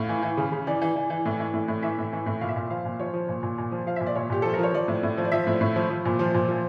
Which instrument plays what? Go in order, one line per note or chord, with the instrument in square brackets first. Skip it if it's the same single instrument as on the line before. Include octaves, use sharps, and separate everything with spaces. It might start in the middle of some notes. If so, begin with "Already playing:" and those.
Already playing: [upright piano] A2 F5
E3
E3
C#3
C#3
E3 D5
E3
E3
E3
A2
E3
A2
A2
E3 E5
A2
E3
A2
A#2 F5
E5
A#2 F5
F3 F5
A#2
F3 C#5
F3
A#2
A#2
A#2
F3
F3 F5
A#2 E5
D5
A#2 C#5
A#2 G4
F3 A4
A#4
F3 C#5
F3 D5
A2
A2
F3
D5
F3 E5
A2
A2
F3
F3
A#2
F3
A#2
F3